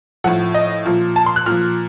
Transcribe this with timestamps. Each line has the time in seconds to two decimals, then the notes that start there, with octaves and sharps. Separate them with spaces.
0.24 A2 F3 F#5
0.54 D#5
0.85 A#2 F3
1.16 A5
1.26 C6
1.36 F#6
1.46 A#2 F6
1.51 F3